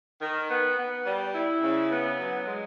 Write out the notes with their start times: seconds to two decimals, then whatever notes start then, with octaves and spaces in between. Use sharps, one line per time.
0.21 D#3
0.49 B3
0.77 B3
1.06 G3
1.34 E4
1.62 C#3
1.90 B3
2.19 F#3
2.46 G#3